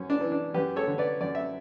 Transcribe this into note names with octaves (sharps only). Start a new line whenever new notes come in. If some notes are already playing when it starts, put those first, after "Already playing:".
Already playing: F#2 C#4
D4
E3
D4
F#2 G4 B4
A4 C#5
D3
B4 D5
F#2 D5
E5